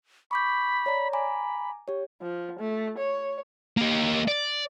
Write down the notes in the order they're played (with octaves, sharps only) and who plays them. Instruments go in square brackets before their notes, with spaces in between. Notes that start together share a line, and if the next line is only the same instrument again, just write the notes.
[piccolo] B5 [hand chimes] C#6 D6 G6
[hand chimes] C#5 D5 A#5
[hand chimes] G#5 A#5 D6 [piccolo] B5
[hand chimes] G4 C#5
[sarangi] F3
A3
C#5
[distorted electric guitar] A#3 G4
D5